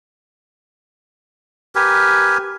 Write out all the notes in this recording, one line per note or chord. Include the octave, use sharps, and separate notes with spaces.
G4 A#4 B4 G#5